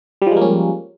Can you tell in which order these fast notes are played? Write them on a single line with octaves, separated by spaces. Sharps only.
G3 F3 G#3 A#3 C#4